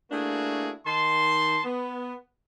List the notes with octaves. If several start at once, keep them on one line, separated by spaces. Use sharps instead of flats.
A3 A#3 D4 E4 F#4 G#4
D#3 A5 C6
B3